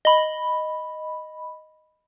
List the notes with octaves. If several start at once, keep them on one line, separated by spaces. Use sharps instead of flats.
D#5 B5